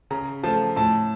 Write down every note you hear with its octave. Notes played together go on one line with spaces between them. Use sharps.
C#3 A#5
F3 A3 A5
A2 A5